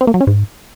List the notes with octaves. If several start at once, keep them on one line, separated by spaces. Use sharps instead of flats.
C4
A#3
F#3
C#4
G#2